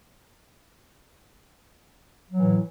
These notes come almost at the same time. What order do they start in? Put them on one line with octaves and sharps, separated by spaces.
F#3 E3 A2